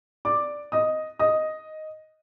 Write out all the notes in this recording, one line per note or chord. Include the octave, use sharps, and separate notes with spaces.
D5 D6
D#5 D#6
D#5 D#6